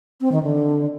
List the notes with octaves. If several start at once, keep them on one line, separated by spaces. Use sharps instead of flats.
C4
D#3
D3